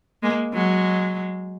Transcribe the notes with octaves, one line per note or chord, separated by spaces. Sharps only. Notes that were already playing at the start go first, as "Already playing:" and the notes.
G#3 A#3
F#3 G#3